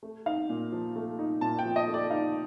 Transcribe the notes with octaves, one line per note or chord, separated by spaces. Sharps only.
A3
D#4 F5
A#2
F3
A3
D#4
A#2 A5
G5
F3
D#5
A3
D5
D#4 F5